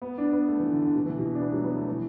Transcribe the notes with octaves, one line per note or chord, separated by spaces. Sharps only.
B3
D4
B3
A3
E3
D3
D3
B2
E3
B2
D4
B3
F#3
B3
A3
E3